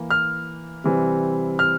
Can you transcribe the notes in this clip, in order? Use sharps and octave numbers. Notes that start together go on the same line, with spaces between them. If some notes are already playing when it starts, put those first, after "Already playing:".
Already playing: E3 A#3
F6
C3 E3 G3 C4
F6